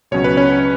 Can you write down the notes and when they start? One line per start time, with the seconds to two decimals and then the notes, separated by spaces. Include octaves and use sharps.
0.11 C#2 B2 F#3 C#4 C#5
0.24 B4
0.37 C#4 C#5